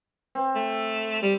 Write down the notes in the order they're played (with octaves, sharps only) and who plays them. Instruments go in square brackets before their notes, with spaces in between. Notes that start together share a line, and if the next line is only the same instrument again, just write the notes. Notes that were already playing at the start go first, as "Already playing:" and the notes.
[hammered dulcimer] C4
[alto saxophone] A3
G3